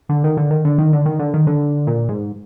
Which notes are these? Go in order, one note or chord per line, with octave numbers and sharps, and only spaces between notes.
D3
D#3
D3
D#3
D3
D#3
D3
D#3
D3
D#3
D3
A#2
G#2